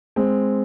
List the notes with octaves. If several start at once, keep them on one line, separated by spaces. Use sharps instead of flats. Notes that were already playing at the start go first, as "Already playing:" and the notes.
G#3 C4